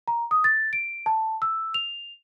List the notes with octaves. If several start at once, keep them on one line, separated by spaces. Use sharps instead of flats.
A#5
D#6
A6
D7
A5
E6
F7